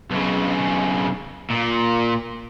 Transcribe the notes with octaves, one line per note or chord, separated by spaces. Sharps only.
B1 C#3
A#2